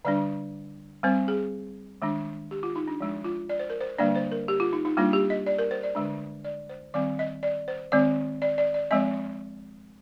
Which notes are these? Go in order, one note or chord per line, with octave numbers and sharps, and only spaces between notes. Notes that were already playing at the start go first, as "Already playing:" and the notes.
D3 G3 D4 D5
G3 C4 C5
G#4
D#3 G#3 D4
G4
F4
D#4
D4
F3 G#3 D4
F4
D5
C5
A#4
C5
D3 G3 A#3 D4 D5
C5
A#4
G4
F4
D#4
D#4
G3 A#3 D4 F4
G4
D#5
D5
A#4
C5
D5
D3 G#3 D4
D5
C5
D#3 G3 C4 D5
D#5
D5
C5
D#3 G#3 C4 D5
D5
D5
D5
F3 G#3 C4 D#5